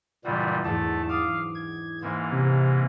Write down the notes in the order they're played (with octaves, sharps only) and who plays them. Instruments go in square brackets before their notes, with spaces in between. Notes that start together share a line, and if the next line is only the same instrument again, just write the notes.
[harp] F#1 D4 F#4 [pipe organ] A#2 E3 G3
[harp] E2 G#2 [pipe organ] A3 A5
[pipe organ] F5 [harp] D6 D#6
[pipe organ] G#6
[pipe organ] G#2 E3 A#3 [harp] C4
[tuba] C3